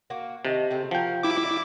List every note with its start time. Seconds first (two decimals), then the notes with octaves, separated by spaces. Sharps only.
0.10 A#3 F#4
0.45 C3 D#3 D#5 A5
0.71 C#3 A3 C4
0.91 F3 F#4 A#4 G5
1.23 G3 E4 D6
1.45 D5